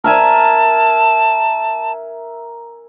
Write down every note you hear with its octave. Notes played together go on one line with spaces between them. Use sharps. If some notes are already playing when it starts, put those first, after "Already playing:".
A#4 E5 G#5 A5